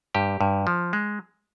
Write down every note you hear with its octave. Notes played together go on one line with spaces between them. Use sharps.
G2 G4
G2
F3
G#3